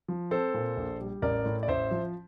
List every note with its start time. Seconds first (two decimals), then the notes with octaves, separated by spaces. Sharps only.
0.08 F3
0.31 C4 A4 C5
0.54 A#2
0.77 A#1
1.00 G3
1.22 A1 A#4 D5
1.45 A2
1.63 D5
1.68 A1 C5 E5
1.91 F3